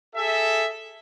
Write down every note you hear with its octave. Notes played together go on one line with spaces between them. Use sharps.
G#4 A4 E5